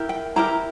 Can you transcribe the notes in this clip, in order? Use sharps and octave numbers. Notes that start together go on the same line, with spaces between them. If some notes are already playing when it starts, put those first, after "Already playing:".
Already playing: E4 G4 A#4
G5
E4 G4 A#4 A#5